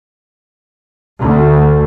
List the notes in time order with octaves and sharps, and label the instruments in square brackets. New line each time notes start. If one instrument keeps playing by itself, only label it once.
[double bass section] D2